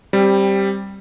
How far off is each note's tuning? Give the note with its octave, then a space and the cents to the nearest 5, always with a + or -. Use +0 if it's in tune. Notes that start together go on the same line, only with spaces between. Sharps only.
G3 +0 C4 +15